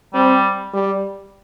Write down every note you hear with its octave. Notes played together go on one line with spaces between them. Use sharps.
G3 C4
G3